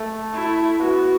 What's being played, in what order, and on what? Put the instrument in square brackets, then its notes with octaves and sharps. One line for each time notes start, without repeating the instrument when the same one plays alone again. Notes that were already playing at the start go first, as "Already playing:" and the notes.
Already playing: [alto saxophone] A3
[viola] E4
[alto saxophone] B3 [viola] F#4